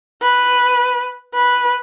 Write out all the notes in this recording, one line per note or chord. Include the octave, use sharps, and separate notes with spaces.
B4
B4